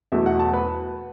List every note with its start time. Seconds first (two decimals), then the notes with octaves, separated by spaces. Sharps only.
0.12 E2 B2 F#3 A3 E5
0.26 F#5
0.39 A5
0.53 B4